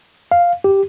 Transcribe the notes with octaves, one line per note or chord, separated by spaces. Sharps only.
F5
G4